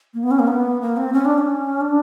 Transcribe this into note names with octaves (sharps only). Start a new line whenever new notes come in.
A#3
B3
C#4
A#3
B3
A#3
C4
C#4
D4
C#4
D4